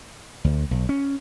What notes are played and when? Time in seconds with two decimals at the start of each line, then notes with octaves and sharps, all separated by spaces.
0.44 D2
0.71 B1
0.89 C#4